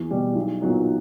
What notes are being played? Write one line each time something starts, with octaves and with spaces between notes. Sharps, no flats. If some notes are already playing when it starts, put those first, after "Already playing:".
Already playing: E2
B2 G3
B1
A#2 F#3 B3 D#4